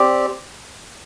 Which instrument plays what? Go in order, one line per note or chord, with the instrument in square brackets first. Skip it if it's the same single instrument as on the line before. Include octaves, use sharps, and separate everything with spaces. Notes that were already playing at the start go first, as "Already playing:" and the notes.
Already playing: [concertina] C4 G4 D5